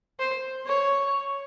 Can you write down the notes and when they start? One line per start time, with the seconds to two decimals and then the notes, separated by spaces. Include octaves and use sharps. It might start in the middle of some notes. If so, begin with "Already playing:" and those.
0.19 C5
0.66 C#5